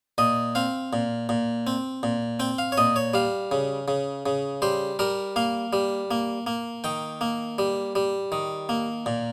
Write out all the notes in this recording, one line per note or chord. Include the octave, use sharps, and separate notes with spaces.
A#2 D#5
C4 F5
A#2
A#2
C4
A#2
C4 G5
F5
C#5
A#2 D#5
C#5
G3 F5
C#3
C#3
C#3
G3 C5
G3 A#4
A#3 F5
G3
A#3
A#3
D#3 G5
A#3
G3
G3
D#3
A#3
A#2